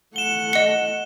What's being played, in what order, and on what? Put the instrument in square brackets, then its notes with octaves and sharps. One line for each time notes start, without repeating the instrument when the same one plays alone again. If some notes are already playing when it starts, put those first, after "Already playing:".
[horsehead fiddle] A3 F#5 [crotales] E7 G7
[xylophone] D#5 C#7